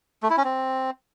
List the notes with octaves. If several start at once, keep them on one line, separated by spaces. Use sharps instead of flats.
A3
E4
C#4
C4